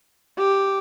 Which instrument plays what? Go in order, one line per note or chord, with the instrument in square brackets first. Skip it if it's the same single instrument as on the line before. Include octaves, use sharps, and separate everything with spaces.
[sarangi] G4